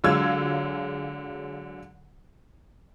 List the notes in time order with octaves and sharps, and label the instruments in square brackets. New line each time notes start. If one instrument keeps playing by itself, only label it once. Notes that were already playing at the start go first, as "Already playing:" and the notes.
[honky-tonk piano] D3 F#3 G#3 F4 E6 G#6